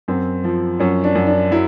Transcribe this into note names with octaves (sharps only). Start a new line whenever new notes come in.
F#2 C4
F3
F#2 C#4
D4
F#2
D4
F#3 E4